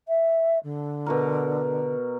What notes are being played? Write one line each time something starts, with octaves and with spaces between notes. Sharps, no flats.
E5
D3
B2 F#4 A#4